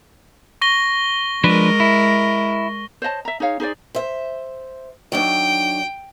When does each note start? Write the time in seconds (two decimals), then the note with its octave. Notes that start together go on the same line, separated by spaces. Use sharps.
0.61 C#6 A#6 G7
1.44 F3 G#3 D4 A#4 B4
1.80 E4
3.02 C5 C#5 D#5 A5
3.25 E5 A#5
3.40 D#4 G#4 C#5 F5
3.60 D#4 G#4 C5 D5
3.95 C5 E5
5.12 D#3 F#3 D4 G5